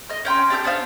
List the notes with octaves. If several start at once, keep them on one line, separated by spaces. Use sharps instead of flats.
D#5 F6
C#4 G5 B5 C6
D4 G4 E6 G6
B3 D4 C5 F5